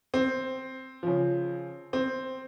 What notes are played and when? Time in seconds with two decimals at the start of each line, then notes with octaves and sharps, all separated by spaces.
0.14 C4
1.03 C#3 F3
1.93 C4